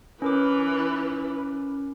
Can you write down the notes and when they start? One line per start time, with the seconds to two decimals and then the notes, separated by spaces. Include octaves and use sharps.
0.22 E3 C#4 A#4 B4 D6